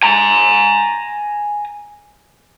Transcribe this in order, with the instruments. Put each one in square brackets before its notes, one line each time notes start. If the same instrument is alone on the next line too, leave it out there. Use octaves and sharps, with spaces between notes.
[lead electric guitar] G#5 A#5